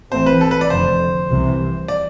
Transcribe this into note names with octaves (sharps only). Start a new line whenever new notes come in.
A1 A2 E3 A3 C4 C5
B4
A4
B4
D5
F1 F2 D3 C5
C2 C3 E3
D5